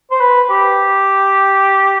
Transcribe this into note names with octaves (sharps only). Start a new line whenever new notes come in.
C5
B4
G4